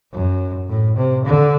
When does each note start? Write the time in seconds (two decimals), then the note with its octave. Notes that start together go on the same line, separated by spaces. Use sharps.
0.13 F#2
0.69 A2
0.97 C3
1.26 D3